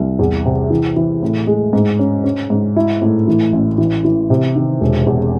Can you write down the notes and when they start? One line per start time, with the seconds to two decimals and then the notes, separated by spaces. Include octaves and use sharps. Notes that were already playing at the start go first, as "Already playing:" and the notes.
Already playing: C2
0.19 E2
0.46 C3
0.70 E3
0.96 E3
1.23 A2
1.47 G#3
1.73 G#2
1.99 C#4
2.24 C#4
2.50 G#2
2.76 E4
3.02 A2
3.28 E3
3.53 A1
3.78 E3
4.04 E3
4.30 C3
4.56 D#3
4.81 E1
5.07 E2